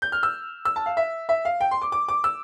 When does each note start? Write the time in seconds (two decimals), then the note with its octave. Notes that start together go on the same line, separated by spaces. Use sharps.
0.02 G6
0.12 F6
0.23 E6
0.65 E6
0.76 A5
0.86 F5
0.97 E5
1.29 E5
1.45 F5
1.61 G5
1.71 C6
1.82 D6
1.92 D6
2.08 D6
2.24 E6